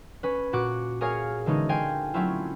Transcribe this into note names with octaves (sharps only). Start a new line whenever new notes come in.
C#4 B4
A#2 F#4 D6 F#6
G#4 A#4 C#5 F5 G#5
D3 E3 G#3 C#4 D#4
C5 F5 G5 G#5
F#3 A3 C4 C#4 E4 F4